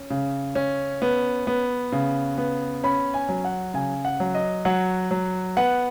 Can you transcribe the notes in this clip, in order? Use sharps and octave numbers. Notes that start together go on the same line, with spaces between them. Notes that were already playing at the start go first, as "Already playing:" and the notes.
Already playing: C#4
C#3
C#4
B3
B3
C#3
B3
C#4 B5
G#5
F#3
F#5
C#3 G#5
F#5
F#3
D#5
F#3 F#5
F#3
B3 F#5